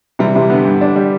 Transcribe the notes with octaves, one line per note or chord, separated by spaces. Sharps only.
C3 E3 G3
C3 E3
D3 B3
G2
D4
G3